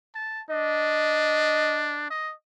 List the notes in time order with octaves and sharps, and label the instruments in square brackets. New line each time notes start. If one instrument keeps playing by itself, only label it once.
[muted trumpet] A5
[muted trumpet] D4 [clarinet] D#5
[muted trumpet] D#5